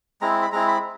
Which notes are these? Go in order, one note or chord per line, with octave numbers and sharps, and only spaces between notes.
G#3 C4 E4 A#5
B5
G#3 C4 E4 A#5
B5